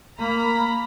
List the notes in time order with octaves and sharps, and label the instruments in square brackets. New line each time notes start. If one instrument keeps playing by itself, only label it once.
[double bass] A#3 [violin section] A#5 B5